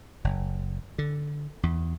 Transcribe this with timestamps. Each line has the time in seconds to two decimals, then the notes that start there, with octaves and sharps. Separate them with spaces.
0.24 F#1
0.98 D3
1.63 E2